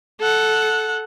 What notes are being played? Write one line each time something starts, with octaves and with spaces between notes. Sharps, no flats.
A4 F#5